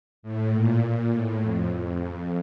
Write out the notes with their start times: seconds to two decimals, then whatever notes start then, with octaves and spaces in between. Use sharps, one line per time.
0.23 A2
0.53 A#2
0.83 A#2
1.13 A2
1.43 F2
1.73 F2